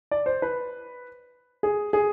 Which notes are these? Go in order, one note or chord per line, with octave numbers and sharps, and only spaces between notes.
D5
C5
B4
G#4
G#4